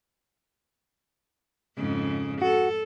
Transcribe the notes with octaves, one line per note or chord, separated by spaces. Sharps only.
F2 G#2 C#3
F#4 A4